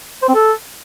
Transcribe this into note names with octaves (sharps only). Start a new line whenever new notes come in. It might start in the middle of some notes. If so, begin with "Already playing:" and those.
C5
C4
A4